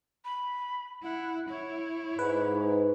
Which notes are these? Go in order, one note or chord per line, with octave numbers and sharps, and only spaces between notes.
B5
E4 F#5
E4 C#5
G#2 B4